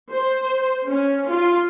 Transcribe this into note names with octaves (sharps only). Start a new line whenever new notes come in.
C5
C#4
F4